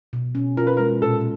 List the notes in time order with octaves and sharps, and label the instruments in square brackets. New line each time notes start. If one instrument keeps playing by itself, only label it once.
[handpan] B2
C#4
[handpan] F4 [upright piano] A#4
[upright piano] B4
A#4
[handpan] G#3
[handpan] A#2 [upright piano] A4